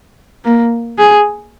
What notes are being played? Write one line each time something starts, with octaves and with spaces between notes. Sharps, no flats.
A#3
G#4